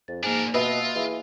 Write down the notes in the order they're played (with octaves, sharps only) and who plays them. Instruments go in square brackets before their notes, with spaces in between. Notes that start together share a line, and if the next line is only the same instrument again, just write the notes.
[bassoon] F2 [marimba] A6
[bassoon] G#2 [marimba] A#3 G#5 [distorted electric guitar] D4 A#4
[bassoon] B2 [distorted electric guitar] F4 [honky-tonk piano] B4 D#5 E5
[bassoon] E3 [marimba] G#4 F5